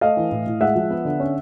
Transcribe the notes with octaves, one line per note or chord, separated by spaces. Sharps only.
A3 D#5 F5
E3
A2
A2
G#3 E5 F#5
F3
B3
D3
C#4